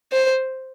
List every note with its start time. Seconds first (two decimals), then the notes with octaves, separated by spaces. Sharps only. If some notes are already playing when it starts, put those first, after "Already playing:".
0.12 C5